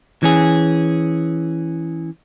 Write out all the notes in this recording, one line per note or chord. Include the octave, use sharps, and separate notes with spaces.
E3 C#4 G#4